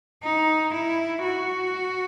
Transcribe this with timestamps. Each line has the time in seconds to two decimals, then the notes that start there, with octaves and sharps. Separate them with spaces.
0.23 D#4
0.73 E4
1.23 F#4